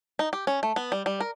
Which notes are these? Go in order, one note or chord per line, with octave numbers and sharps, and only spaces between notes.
D#4
G4
C#4
A3
B3
G3
G3
A#4